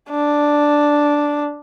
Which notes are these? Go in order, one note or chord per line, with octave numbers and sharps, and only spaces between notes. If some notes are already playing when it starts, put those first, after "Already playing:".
D4